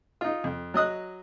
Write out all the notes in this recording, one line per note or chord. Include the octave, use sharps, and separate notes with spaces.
D#4 F4
F2
F#3 D#5 D#6 F#6